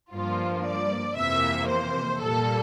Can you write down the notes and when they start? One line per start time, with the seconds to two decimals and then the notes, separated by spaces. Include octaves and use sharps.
0.12 G2 F3 A#3 F4
0.65 D5
1.17 F2 C3 E3 A#3 E5
1.69 C5
2.21 A#2 G3 A#3 A4